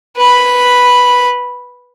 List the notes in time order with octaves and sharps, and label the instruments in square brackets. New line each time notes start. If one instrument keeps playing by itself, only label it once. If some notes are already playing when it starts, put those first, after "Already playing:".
[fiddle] B4 B5